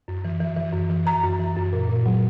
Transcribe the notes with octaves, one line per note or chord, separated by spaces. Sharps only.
F#2
E3
E3
E3
F#2
E3
E3 A#5
F#2
E3
F#2
A#2
A#2
F#3